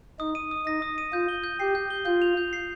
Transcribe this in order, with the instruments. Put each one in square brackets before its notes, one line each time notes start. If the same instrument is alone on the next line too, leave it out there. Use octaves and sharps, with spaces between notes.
[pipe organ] D#4 [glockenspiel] D#6
[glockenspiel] D#7
D#6
[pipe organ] D#4 [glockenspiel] A#6
[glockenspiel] D#6
D#7
[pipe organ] F4 [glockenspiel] G6
[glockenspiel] G7
G6
[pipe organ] G4 [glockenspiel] C7
[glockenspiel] G6
G7
[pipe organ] F4 [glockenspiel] G6
[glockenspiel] F7
G6
C7